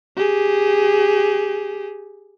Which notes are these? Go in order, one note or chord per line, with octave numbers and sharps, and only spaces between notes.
G4 G#4